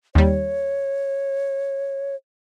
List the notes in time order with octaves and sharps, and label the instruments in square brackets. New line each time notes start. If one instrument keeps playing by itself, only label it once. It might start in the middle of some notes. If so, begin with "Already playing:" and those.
[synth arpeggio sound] D#2 G3 [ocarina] C#5